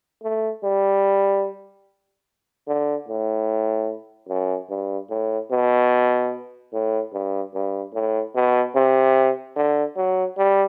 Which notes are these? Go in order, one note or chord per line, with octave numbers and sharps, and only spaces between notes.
A3
G3
D3
A2
F#2
G2
A2
B2
A2
G2
G2
A2
B2
C3
D3
F#3
G3